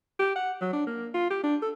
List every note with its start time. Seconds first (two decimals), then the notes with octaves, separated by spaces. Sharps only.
0.19 G4
0.36 F#5
0.61 F#3
0.73 D4
0.87 A#3
1.14 F4
1.30 G4
1.44 D4
1.62 A4